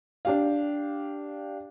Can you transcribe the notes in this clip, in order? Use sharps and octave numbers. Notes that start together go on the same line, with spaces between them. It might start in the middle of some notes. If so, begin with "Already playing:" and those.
D4 G4 F5